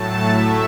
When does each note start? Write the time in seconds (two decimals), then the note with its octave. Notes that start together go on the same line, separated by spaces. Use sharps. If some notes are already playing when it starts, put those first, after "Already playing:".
Already playing: A2 F#3 A3 A5
0.29 A2 A3 E5